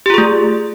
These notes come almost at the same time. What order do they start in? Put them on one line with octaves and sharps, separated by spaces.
G4 F4 G#4 A3